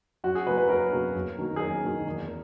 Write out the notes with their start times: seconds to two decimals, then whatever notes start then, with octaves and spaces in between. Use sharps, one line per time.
0.24 F#2 F#4
0.35 G#4
0.46 C#3 F#3 A#3 B4
0.58 B4
0.69 F#2 A#4
0.92 C#3 F#3 A#3
1.15 F#2
1.38 D#3 F#3 A#3
1.56 G#4
1.60 F#2 A#4
1.84 D#3 F#3 A#3
2.06 E2
2.28 A#3